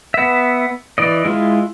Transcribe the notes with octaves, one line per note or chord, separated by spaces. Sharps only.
B3 E5
E3 D5 D#5
G#3 E4 F4